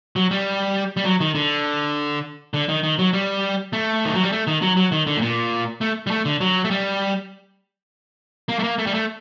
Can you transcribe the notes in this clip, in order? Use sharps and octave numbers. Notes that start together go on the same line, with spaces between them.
F#3
G3
G3
F#3
D#3
D3
D3
D#3
D#3
F#3
G3
A3
D#3
F#3
G3
A3
D#3
F#3
F#3
D#3
D3
A2
A#2
A3
G3
A3
D3
F#3
A3
G3
A#3
A3
A#3
A3
G3
A3